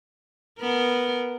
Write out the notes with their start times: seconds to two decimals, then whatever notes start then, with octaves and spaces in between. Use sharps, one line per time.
0.60 B3 A#4